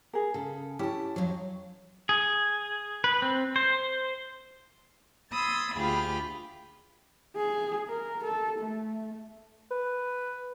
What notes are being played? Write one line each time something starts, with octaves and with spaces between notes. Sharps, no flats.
G#4 A#4
C#3 A4
C#4 E4 G4 A5
F2 F#3 C#5
G#4
B4
C4
C5
B5 C6 D#6 E6 G#6 A6
D2 F4 G4 G#4 B5 F6
G#4
A#4
A4
A3
B4